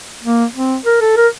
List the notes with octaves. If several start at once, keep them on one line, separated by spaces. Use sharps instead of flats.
A#3
C4
A#4
A4
A#4